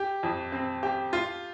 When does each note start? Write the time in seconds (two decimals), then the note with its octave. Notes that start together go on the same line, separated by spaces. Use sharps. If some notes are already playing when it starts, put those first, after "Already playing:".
Already playing: G4
0.23 F2
0.52 C4
0.83 G4
1.13 F4